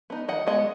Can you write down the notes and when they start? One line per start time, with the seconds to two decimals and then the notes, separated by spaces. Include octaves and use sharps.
0.10 B3 D#4
0.28 D#3 D#5 F#5
0.47 G#3 B3 D#5 F#5